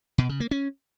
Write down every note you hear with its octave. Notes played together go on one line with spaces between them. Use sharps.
B2
C#3
A#3
C#4